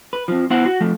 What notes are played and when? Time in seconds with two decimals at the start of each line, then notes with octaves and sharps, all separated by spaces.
0.13 B4
0.28 F2 F3
0.50 B3 E4 C5 F#5
0.65 F#4
0.81 F3 A3